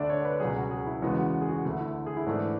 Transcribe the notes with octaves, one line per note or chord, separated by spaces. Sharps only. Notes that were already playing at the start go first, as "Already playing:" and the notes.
Already playing: D2 D3 A3 D4 D5 E5
C#5
B4
C#2 B2 F#3 G#4
F#4
G#4
E4
E2 C#3 E3 G#3 B3 F#4
F#4
G#4
F#4
D2 D3 A3
E4
G#4
E4
G#2 E3 A3 D4